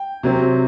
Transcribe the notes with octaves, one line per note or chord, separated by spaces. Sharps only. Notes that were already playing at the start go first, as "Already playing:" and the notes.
Already playing: G5
C3 F#3 C4